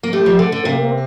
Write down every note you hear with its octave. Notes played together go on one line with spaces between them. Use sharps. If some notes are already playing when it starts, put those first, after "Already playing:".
A#3
A3 G4
F3
D3 A4
D3
C3 A#3
A#3
C4